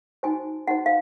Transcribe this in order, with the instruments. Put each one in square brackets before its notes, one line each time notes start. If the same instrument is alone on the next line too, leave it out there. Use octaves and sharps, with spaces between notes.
[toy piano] D#4 F#4 C5 G#5
D#4 F#4 C5 F#5
F5